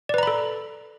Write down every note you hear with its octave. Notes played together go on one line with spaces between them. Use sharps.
A4 B4 D5 A#5 B5